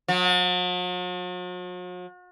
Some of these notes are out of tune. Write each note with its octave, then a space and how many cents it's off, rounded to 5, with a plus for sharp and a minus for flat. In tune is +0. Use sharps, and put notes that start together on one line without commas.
F#3 -45